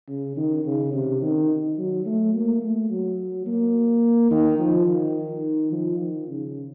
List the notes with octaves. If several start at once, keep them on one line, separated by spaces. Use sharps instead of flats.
C#3
D#3
C#3
C3
D#3
F#3
A3
A#3
A3
F#3
A#3
D#3
F3
D#3
F3
D#3
C#3